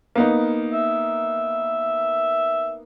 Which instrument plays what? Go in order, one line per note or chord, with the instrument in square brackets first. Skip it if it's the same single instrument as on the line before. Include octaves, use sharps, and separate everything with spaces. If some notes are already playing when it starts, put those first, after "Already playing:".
[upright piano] A#3 B3 D#4
[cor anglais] E5